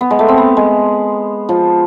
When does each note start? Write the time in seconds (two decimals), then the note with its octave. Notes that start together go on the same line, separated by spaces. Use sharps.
0.01 B3
0.10 G#3
0.19 A3
0.28 C4
0.37 B3
0.57 G#3
1.49 F3